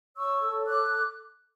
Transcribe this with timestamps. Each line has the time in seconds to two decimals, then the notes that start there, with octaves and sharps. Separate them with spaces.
0.17 C#5 C#6 E6
0.42 A4
0.67 C#5 D6 F#6